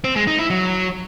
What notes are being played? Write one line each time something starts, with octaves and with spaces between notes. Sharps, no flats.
C4
G#3
D#4
E4
F#3